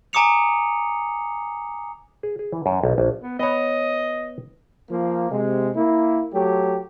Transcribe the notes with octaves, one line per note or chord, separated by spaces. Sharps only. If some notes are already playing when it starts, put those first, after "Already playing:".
G#5 A#5 D6 D#6 C#7 F7
G#4
G#4
E3
F#2
B1
A#1
B3
B3 C#5 D#5
F3 A#3
C3 G#3
A#3 E4
F#3 A3 G4